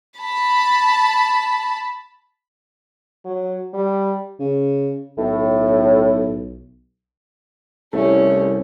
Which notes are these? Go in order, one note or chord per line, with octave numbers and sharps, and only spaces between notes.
A5 B5
F#3
G3
C#3
B1 A2
C2 A3 C#4 E4